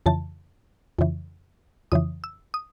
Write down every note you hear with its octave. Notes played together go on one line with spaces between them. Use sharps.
F2 C#3 E3 A5
F2 C#3 E3
F2 C#3 E3 D#6
E6
D#6